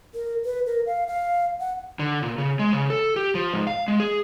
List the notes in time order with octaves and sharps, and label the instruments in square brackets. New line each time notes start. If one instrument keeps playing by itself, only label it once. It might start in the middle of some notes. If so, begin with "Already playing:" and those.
[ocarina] A#4
B4
A#4
F5
F5
F#5
[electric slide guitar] D3
A#2
C#3
G#3
C#3
A4
G4
F3
G#2
F5
G#3
G#4